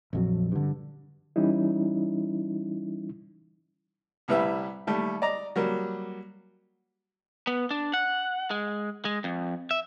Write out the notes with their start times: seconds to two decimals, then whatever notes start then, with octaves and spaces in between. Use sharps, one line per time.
0.13 A#1 F2 F#3
0.52 G2 D3
1.36 E3 G3 C#4 D#4 E4
4.28 C2 A2 G3 B4 E5
4.87 D#2 G3 A3
5.22 D5 D#5 A#5
5.56 F#3 G3 A#3
7.47 B3
7.71 D4
7.93 F#5
8.51 G#3
9.05 G#3
9.24 F2
9.71 E5